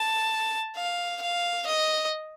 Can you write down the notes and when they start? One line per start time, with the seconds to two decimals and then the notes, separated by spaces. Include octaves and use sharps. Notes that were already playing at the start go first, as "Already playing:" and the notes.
Already playing: A5
0.76 F5
1.22 F5
1.66 D#5